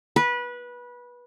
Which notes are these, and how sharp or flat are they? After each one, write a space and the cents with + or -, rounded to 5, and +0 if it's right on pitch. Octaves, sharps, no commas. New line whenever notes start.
B4 -20